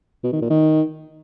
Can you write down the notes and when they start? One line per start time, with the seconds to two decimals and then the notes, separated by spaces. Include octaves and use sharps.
0.24 B2
0.32 D#3
0.41 A#2
0.50 D#3